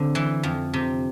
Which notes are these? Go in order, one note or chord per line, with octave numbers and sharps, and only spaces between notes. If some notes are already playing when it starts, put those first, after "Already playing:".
Already playing: D3 C4
E3
F2
C3